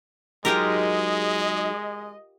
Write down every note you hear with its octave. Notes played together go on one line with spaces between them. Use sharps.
F#3 G#3 D#4 F4 G4 G#4 A#4 D#5